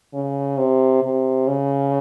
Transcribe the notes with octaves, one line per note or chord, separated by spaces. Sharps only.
C#3
C3
C3
C#3